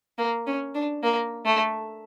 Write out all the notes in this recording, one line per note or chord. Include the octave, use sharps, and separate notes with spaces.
A#3
C#4
D4
A#3
A3